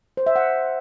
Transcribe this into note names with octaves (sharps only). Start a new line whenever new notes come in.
C5
E5
F#5